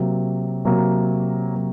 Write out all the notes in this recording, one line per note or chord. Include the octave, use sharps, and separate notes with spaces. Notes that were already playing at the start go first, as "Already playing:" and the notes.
Already playing: C3 F#3 A#3
C3 F#3 A#3
F#3 A#3